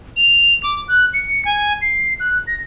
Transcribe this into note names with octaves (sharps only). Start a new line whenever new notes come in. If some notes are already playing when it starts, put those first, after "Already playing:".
F7
D6
F#6
C#7
G#5
C7
F#6
A#6